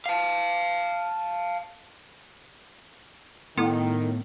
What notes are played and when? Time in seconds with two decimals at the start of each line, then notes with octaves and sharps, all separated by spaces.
0.06 F5 A5
3.57 A2 D#3 B3 E4 A4 G5